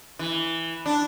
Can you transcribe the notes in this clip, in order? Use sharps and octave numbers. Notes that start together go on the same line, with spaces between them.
E3
D4